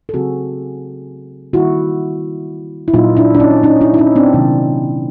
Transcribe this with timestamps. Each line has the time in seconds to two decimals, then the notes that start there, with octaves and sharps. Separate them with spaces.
0.09 A4
0.14 C#3 F#3 A3 C4 F#4 G#4
1.53 D#3 G3 A#3 E4 F#4
2.88 E4
2.94 A#2 F#3 A#3 D#4 F4
3.17 D4 E4
3.35 D4
3.40 C#4 D#4
3.63 C#4 D#4
3.81 D4 E4
3.94 E4
3.98 C#4 D#4
4.16 C4 D4
4.33 C3 D#3 F#3 A#3